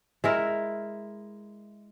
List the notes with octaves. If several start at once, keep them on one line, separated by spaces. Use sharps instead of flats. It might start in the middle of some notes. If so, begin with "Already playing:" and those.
G#3 E4 A#4